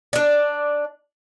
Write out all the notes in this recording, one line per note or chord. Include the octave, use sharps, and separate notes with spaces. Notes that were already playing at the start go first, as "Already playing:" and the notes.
D4 D5